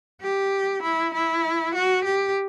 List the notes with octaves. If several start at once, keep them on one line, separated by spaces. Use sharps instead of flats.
G4
E4
E4
F#4
G4